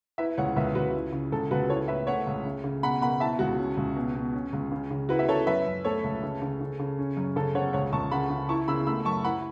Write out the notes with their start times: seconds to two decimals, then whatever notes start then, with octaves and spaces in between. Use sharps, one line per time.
0.18 E4 B4 E5
0.38 C#2 C#5 F#5
0.56 C#2 B4 E5
0.75 C#2 F#4 B4
0.94 E4
1.12 C#3
1.32 C#2 A4
1.51 C#2 F#4 B4
1.69 E4 A4 C#5
1.88 A2 B4 E5
2.07 A3 C#5 F#5
2.27 C#2
2.45 C#3
2.64 C#3
2.83 B2 F#5 B5
3.02 B2 F#5 B5
3.20 E4 E5 A5
3.39 C#2 F#4
3.58 C#4
3.77 C#2
3.96 B2
4.15 B2
4.34 C#4
4.53 C#2
4.72 C#3
4.91 C#3
5.09 E4 F#4 B4
5.19 E5
5.28 C#3 A4 C#5
5.47 F#2 B4 E5
5.66 F#2
5.85 A3 A4 C#5
6.04 C#2
6.23 C#3
6.42 C#3
6.61 C#3
6.79 C#3
6.99 C#4
7.17 F#2
7.36 C#3 A4
7.55 C#3 C#5 F#5
7.73 C#2 C#5 F#5
7.92 C#2 A5 C#6
8.11 C#3 F#5 B5
8.30 C#3
8.49 E4 A5 C#6
8.68 C#3 B5 E6
8.87 A3 B5 E6
9.05 F#2 A5 C#6
9.24 E4 F#5 B5